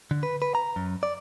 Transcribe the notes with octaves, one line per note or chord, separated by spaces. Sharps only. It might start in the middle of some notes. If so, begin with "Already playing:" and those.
D3
B4
B4
A#5
F#2
D5